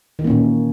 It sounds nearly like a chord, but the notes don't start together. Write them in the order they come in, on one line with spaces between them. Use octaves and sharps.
D#3 E3 A#3 C#4 A#2